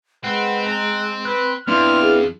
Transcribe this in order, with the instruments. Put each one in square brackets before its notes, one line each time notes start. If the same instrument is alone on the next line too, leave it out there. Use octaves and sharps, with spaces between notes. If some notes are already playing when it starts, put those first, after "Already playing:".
[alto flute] G#3 [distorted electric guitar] C4 [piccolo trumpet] B4 [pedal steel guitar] F#5
[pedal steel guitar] A#5 [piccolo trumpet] F#6
[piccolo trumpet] B4 [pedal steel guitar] F#6
[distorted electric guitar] F2 [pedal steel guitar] B3 D4 E4 [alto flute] C6 [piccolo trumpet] F6
[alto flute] G#4